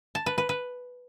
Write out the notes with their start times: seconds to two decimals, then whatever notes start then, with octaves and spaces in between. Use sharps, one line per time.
0.15 A5
0.26 B4
0.38 B4
0.49 B4